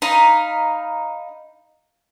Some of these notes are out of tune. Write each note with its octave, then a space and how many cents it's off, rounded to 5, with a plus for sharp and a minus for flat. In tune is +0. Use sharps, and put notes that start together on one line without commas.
D#4 +0 F5 +0 B5 +0